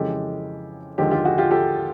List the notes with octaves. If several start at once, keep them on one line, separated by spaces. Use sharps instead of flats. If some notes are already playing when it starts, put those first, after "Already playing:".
Already playing: F2 C#3 E3 G#3 G4 A4
D#2 D3 F3 G#3 G4 A4
F4 G4
F#4 G#4
F4 G4
G4 A4